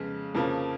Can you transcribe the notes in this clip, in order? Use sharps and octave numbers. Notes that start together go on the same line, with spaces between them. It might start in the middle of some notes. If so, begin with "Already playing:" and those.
Already playing: F2 C#3 G#3 B3
F2 C#3 F3 A#3